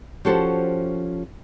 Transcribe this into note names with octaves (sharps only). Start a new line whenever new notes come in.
F3 C#4 F#4 G4 A4 C5